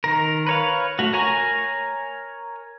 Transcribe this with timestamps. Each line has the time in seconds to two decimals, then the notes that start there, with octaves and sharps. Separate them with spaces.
0.04 D#3 A#4
0.47 B4 C#5 F5
0.99 A3 F#4
1.13 A#4 C#5 G#5 A#5 C#6